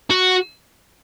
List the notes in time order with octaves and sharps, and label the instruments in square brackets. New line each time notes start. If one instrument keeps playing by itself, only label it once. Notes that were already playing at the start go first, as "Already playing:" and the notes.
[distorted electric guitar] F#4